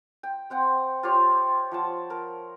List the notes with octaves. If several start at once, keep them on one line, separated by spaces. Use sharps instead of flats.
G5
C4 F#5 G5
F4 G4 C5 C#5
F3 F#5 A5
A#4